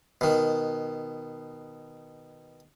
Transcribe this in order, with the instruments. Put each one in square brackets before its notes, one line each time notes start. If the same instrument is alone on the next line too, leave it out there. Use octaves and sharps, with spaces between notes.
[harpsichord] B2 D#3